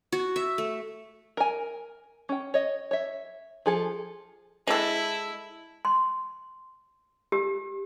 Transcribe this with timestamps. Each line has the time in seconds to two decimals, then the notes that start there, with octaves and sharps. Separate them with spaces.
0.12 F#4
0.36 E5
0.58 A3
1.37 A#4 G#5
2.29 C#4 G5
2.54 C#5 D#5
2.91 C#5 E5
3.66 F3 G#4 A4
4.67 G#3 E4 A4
5.85 C6
7.32 G4